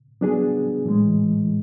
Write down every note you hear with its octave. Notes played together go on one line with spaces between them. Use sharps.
F#3 B3 D4 G#4
A2 E3 G#3